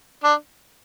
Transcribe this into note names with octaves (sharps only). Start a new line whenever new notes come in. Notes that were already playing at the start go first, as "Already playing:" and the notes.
D4